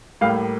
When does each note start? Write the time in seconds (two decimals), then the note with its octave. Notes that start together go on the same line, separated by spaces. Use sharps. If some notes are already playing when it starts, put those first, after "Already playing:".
0.21 A2 G3 A#3 F5